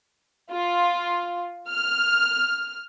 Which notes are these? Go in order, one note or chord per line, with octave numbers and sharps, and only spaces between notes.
F4
F6